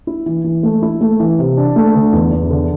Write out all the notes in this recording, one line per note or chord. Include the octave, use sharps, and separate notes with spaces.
E4
E3
E3
A3
E4
A3
E3
C3
D4
A3
D3
E2
E2
D3